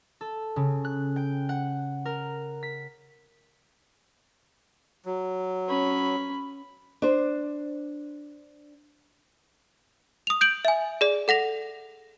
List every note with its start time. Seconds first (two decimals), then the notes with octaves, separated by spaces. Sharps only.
0.21 A4
0.56 C#3
0.85 F#6
1.16 G5
1.49 F#5
2.05 A#4
2.63 B6
5.05 F#3
5.68 C#4 B5
7.02 D4 C5
10.27 D#6 F7
10.41 G6 D7 F#7
10.65 E5 G#5
11.01 G#4 D5
11.28 A4 F#5 A#6 F7